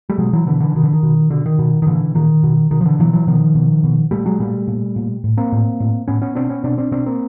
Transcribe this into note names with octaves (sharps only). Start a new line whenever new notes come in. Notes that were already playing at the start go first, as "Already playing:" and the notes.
G3 A3
B2 F#3 G#3
E3 F#3
B2 D3 E3
D3 E3
B2 D#3
D3 E3
D#3
B2
B2 D3
D#3
B2
D#3
A#2 D3 E3
A#2 D#3
B2
B2 D#3
F3
D3 E3
B2 E3 F#3
E3 F#3
B2 D#3 F3
B2
B2
A#2 G3 A3
F#3 G#3
A#2 G3 A3
A#2
A#2
A2
A#3 C4
A2
A2
A2 B3 C#4
B3 C#4
B2 C4 D4
B3 C#4
B2 C4 D4
C4 D4
B2 C4 D4
A#3 C4